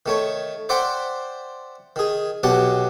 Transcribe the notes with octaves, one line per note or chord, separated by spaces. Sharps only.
D#3 A3 C#5
C5 D5 E5 F#5 G5 C6
D#3 G#4
B1 B2 F#3 G4 F#5 A5